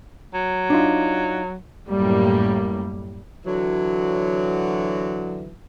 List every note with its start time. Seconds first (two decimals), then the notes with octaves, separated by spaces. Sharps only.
0.34 F#3
0.70 D4 D#4 F4
1.89 F#2 A2 G3 A#3
3.46 D3 E3 F#3